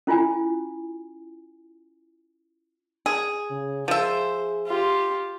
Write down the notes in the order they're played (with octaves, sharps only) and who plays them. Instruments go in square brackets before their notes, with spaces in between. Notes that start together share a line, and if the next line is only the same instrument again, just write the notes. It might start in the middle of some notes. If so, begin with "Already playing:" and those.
[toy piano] C#4 E4 F4 G#5
[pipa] G#4
[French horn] C#3
[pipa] F3 E5 [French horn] G#4 [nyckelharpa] C5
[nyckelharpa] F4 G4